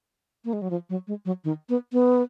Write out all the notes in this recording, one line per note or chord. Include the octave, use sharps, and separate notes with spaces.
A#3
G#3
F#3
F3
F#3
G#3
F#3
D#3
B3
B3